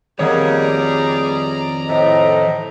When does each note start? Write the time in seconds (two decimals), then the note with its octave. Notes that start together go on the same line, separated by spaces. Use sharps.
0.19 F2 D#3 G3 A#3 G#4 C#5 F#5
0.60 D5 A#5
1.88 A2 C5 D#5